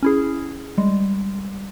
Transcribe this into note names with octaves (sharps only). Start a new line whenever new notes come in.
C#4 E4 G#4
G3 G#3